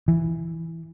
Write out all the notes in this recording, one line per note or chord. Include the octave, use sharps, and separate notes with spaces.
E3